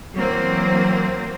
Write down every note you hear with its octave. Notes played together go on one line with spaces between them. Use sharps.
E3 F#3 A#3 C4